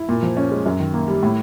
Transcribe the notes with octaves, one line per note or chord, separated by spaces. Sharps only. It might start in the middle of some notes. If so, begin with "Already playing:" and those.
Already playing: E4
A#2
F3
C#4
G#3
F#2
D#3
A#3
G3
A2